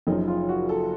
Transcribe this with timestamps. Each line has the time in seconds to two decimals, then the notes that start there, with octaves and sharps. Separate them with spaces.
0.07 F#1 F#2 C#3 F3 D#4
0.28 F4
0.49 F#4
0.69 A4